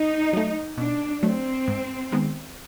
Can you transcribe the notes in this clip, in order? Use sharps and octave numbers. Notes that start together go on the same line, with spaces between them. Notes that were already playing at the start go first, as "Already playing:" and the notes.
Already playing: D#4
F#3 A3
B2 D4
F#3 A3 C4
G#2
D#3 G#3 B3